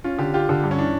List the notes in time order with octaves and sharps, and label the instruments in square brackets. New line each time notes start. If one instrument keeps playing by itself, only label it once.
[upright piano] C#4 [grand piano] F4
[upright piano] D3 [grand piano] G4
[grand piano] F4 [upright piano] G4
[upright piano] D3
G2
[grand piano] C#4
[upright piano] E3 [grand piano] D4